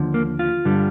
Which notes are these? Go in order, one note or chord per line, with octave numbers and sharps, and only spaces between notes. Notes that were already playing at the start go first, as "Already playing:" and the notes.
Already playing: D#2 D3 F3
A#3
F4
G2 D3 G3